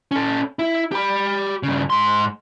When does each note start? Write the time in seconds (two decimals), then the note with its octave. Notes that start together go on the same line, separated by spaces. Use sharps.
0.11 C#4 A4
0.59 E4
0.92 G4 B5
1.63 G2 C#3
1.90 G#2 C6